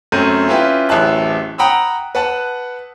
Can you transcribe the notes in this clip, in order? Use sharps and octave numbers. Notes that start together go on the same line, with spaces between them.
F#2 A3 C4 G6 D#7
C#4 E4 F4 G4 B4
D1 A1 E5 G#5 A5 F#6
F#5 G5 A#5 B5 D#6 E6
B4 F#5 A5